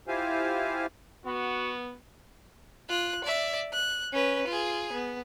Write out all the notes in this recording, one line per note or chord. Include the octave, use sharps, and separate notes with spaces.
E4 F4 G4 C5 F5 G#5
B3 F#4
F4 F#6
D5 E5
F#6
C#4 B4
F4 G#4
B3